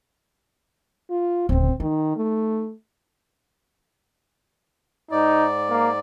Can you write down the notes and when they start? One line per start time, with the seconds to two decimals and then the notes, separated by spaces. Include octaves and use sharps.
1.10 F4
1.49 D1 C#3 C4
1.80 D#3 D#4
2.17 A3
5.11 G#2 D#4 D5
5.70 A#3